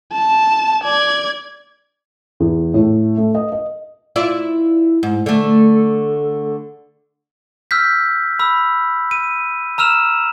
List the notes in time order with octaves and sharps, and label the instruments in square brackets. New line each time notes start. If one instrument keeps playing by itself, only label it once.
[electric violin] A5
D5 G#6
[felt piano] E2
A2
A3
D#5
D#5
[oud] E4 F4 D5
G#2
D3 A3
[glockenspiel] E6 F6 G6 B6
B5 E6
D#7
A#5 E6 F6 E7 F7